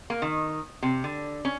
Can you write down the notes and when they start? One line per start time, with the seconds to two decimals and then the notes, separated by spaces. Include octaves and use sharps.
0.10 A#3
0.22 D#3
0.82 C3
1.04 D3
1.45 C#4